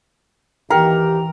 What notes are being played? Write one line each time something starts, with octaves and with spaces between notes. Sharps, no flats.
D#2 E3 G4 A#4 F#5 G5